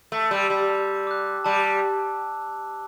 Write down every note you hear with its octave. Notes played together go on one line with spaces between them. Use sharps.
A3
G3 C6 E6
G3
A5
D6 F#6
G3 A5